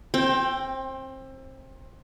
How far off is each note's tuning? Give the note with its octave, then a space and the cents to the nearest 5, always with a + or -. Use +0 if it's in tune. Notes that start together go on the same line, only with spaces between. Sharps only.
C4 +25 G5 +0